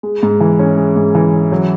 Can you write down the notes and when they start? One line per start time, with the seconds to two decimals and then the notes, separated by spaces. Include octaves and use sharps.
0.03 G#3
0.23 G#2
0.40 E3
0.59 C#4
0.77 G#3
0.96 G#2
1.15 E3
1.33 C#4
1.52 F#3